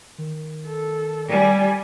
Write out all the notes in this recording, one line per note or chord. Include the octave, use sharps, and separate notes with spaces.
D#3
A4
G3 D5 G#5